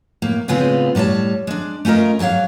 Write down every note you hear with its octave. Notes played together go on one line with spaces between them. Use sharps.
A2 A#3
A2 C#3 G#3 B3 C4 F4
A2 G3 A4 C#5 A5
G#3 D4
A3 C#4 F4 A#4 D#5
G#2 F#3 F4 C#5 F5